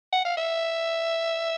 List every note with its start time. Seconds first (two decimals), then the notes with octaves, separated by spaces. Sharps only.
0.12 F#5
0.25 F5
0.37 E5